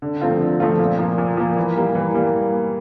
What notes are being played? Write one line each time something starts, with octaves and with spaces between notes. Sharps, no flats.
D3
F3 A3 C4 F4
D3
F3 A3 C4 F4
A#2
F3 A#3
A#2
F3 A#3
E3
G3 A#3
E3
G3 A#3